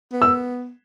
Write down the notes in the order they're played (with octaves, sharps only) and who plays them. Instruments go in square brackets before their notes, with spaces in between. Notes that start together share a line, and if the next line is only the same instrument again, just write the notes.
[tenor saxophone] B3
[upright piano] E6